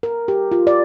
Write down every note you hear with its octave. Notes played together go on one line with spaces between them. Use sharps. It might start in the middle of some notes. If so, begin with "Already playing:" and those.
A#4
G4
F4
D5